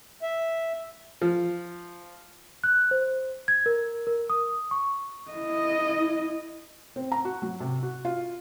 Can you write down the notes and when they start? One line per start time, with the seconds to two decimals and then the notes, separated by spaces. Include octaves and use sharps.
0.23 E5
1.22 F3
2.64 F#6
2.91 C5
3.48 G#6
3.66 A#4
4.07 A#4
4.30 D#6
4.71 C#6
5.31 E4 D#5
6.96 C4
7.12 A#5
7.25 F#4
7.42 F#3
7.60 C3
7.83 F#4
8.05 F4